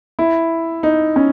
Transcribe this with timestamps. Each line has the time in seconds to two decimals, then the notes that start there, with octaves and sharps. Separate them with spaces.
0.19 E4
0.83 D#4
1.16 C#4